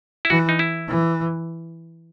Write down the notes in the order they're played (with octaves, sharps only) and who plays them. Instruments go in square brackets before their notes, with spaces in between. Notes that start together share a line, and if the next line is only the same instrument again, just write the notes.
[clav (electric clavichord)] E4
[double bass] E3 [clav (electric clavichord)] F#4
[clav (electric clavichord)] D#4
E4
[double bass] E3